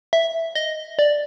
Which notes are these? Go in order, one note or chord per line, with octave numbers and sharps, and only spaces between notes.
E5
D#5
D5